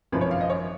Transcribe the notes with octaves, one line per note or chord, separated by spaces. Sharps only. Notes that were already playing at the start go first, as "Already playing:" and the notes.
G#1 F#2 F3 B4
C#5
F5
D#5
C#5